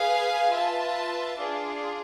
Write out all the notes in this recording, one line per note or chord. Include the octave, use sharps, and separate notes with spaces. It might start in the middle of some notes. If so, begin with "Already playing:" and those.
Already playing: G#4 B4 F5 G#5
F4 B4 E5 A5
D4 F4 G#4